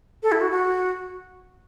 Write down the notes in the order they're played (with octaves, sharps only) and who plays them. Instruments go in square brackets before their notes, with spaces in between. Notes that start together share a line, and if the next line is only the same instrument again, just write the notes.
[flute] A4
E4
F#4
F#4